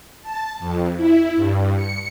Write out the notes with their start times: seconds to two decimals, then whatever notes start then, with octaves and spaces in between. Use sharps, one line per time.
0.22 A5
0.59 F2
0.96 E4
1.36 G2
1.75 C#7